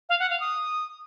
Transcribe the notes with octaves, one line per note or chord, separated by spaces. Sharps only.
F5
F#5
F5
D#6